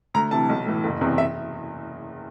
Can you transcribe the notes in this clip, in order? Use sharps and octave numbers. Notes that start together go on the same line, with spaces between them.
D2 A#5
C3 E3 A5
B1
A2 E3
F#1
E2 C3 E3
E5